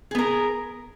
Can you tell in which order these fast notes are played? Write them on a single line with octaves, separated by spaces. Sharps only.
G#4 B3 A#4